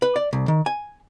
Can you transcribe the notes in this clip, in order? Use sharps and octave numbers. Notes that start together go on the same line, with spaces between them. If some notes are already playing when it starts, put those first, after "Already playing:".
B4
D5
C2
D#3
G#5